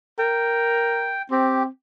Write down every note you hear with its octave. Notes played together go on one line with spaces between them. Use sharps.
A#4 G5
C4 G4